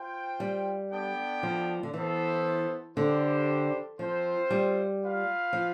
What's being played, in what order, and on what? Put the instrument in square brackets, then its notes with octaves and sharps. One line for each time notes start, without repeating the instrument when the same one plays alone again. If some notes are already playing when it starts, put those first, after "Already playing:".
Already playing: [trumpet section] F4 C5 G5
[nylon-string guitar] G3
[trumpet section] B3 D4 A4 D5 G5
[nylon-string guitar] F3
D3
[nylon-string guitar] E3 [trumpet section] B3 E4 A4 C5
[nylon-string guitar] D3 [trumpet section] G3 D4 G4 C5
[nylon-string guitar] F3 [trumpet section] C4 F4 C5
[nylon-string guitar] G3
[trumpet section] F4 B4 F5
[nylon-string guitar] F3